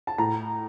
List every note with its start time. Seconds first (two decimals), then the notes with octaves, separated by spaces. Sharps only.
0.07 A5
0.18 A2 A#5